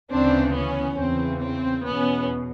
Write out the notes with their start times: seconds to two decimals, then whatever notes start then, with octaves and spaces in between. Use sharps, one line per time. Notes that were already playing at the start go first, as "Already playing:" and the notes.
0.11 D2 C#3 E3 C4 D4
0.55 B3 C#4
0.99 E2 C#3 E3 C4
1.42 C4
1.86 E2 B2 B3 C#4